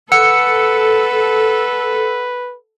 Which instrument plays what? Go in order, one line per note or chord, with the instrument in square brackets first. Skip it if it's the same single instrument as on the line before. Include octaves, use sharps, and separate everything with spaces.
[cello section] A4 [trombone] B4 [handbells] F#5 E6 C#7